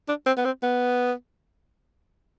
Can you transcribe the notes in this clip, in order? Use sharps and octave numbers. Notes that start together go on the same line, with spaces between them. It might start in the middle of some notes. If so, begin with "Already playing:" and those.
D4
C4
B3
C4
B3